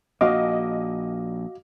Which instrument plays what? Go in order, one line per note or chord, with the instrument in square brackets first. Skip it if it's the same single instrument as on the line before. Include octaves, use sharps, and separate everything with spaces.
[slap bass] A#1 A#3 [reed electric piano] F#4 F5 D6 [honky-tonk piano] D#5